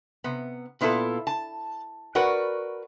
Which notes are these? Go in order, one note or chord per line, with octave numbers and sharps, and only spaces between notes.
C3 B3
A#2 B3 E4 F4 A4
A5
F#4 A#4 B4 D5 F#5